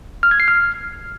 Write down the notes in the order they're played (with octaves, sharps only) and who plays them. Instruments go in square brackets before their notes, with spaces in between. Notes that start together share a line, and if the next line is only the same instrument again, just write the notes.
[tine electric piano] F6
G#6
C7
F6